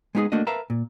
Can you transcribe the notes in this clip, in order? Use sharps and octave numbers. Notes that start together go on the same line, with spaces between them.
G#3 B3 D#4 F4 G#4
A3 A#3 D4 F#4 D#5
A#4 B4 E5 F5 A5 A#5
A#2